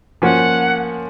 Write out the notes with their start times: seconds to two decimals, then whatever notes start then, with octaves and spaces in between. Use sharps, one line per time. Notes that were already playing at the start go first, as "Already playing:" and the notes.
0.22 F3 A#3 C#4 F#5